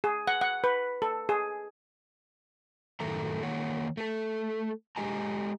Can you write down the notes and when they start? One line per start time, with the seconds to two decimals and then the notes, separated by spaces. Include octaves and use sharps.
0.04 G#4
0.27 F#5
0.41 F#5
0.64 B4
1.02 A4
1.29 G#4
3.00 F#2 A2 D#3 A4 E5 A#5
3.43 D#3 A#3 C#5 F#5
3.97 A3 A4
4.96 G#3 G4 D#5 G#5 A#5